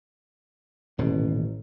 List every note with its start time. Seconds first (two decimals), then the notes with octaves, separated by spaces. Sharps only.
0.98 D#1 A1 B2